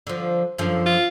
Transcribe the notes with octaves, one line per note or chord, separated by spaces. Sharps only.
D3 F3
F#2 D3 F3
F4